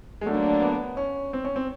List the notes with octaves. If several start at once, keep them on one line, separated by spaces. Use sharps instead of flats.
G#3
D3 F#3 A3 A#3 D4
B3
C#4
C4
C#4
C4